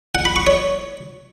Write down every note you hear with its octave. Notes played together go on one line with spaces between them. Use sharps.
F#5
B5
C#6
C#5